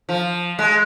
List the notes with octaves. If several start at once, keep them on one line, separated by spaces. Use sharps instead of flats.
F3
G#3